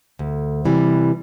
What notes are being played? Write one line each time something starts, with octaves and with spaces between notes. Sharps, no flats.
D2
C3 E3 G3